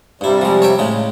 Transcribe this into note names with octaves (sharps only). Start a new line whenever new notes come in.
G2 C3 G3 E4
F3 G#3
C#5 E5 G5
A2 C#3 G#3